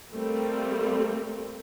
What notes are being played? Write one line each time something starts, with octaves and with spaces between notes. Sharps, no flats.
G3 A3 A#3 C4